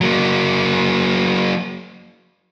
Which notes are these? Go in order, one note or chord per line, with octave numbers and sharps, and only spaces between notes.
F#3 A#3